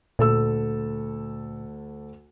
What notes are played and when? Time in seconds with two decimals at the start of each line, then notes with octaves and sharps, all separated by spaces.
0.19 D2 A#2 A4 E6